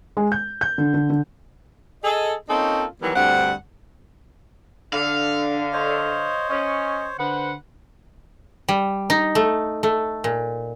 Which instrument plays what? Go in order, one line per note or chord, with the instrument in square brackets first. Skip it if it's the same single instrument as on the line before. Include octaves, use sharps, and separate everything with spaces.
[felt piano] G#3
G6
G6
D3
D3
D3
[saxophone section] G#4 A4 D#5
A#3 C4 C#4 D#4 F4 A4
D#3 E3 F#3 G3 B3
D2 G2 G3 C4 F#5
[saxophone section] D3 [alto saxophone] D4 [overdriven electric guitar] F5
[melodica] C5 C#5 [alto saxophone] D#5
[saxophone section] C#4 [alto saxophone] D#5
[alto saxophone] D3 [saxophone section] B4 C5 F#5
[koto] G3
D#4
A3
A3
A#2